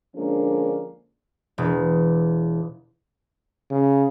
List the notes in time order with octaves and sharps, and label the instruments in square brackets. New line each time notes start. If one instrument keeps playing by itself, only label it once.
[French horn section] D3 F3 G#3 A#3 C#4 D4
[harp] E1
[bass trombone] C#3